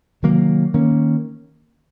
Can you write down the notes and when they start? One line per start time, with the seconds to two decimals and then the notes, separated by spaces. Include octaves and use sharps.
0.23 C3 D#3 F#3 A#3
0.74 D#3 A#3 C#4